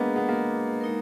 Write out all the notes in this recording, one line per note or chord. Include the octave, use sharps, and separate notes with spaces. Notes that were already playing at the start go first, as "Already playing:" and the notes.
Already playing: G#3 A#3 B3 D4 G#4 B4 D#5
B3
A#3
G#3 D#4 A#4